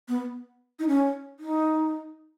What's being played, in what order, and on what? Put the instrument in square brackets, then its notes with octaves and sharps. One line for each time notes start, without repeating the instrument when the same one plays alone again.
[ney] B3
D#4
C#4
D#4